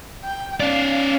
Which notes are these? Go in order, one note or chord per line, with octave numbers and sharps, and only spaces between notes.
G5
C#4 D5 F5